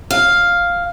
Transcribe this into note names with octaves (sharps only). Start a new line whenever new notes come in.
F5